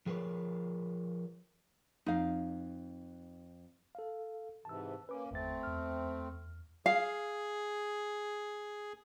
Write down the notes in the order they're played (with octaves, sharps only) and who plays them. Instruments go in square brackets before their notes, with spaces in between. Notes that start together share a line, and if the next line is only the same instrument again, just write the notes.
[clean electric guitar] F3 G#4 A#4 B4 C#5
[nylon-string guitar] F2 [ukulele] D#4 F5
[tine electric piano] A4 F5
[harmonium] G#2 C3 E3 [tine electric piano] A5 E6
[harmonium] A#3 C#4 [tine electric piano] B4 D6
[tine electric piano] G1 E2 A6 [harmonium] A3 C4
[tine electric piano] E2 F6
[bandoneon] G#4 [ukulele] F5